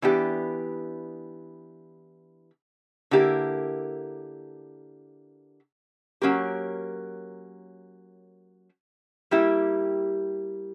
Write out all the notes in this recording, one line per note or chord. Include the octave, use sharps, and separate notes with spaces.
E3 B3 D4 G4
D3 A#3 E4 G4 A#4
F#3 A#3 C#4 G4 A#4
G3 A#3 E4 G4